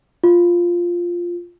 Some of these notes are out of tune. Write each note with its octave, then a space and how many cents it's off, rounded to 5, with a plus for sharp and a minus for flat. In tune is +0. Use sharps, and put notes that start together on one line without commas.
F4 +0